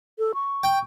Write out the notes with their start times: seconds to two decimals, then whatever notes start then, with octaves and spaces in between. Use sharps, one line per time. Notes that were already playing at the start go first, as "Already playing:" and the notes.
0.19 A4
0.34 C#6
0.63 G5